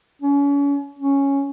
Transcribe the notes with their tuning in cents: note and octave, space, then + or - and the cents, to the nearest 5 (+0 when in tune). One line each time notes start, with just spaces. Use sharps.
C#4 +35
C#4 +0